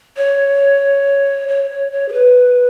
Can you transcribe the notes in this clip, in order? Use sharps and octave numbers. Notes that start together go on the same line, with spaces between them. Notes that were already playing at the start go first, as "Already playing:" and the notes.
C#5
C#5
C#5
C#5
G#4
B4